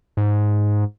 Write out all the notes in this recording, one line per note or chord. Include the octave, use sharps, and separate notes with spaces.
G#2